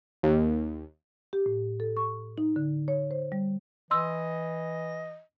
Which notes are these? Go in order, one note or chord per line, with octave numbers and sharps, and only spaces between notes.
D#2
G4
A2
A4
C#6
D#4
D3
C#5
C5
G3
E3 D#5 C6 E6